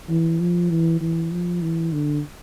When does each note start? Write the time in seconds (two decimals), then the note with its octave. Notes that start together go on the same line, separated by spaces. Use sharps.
0.09 E3
0.40 F3
0.70 E3
1.01 E3
1.31 F3
1.62 E3
1.92 D3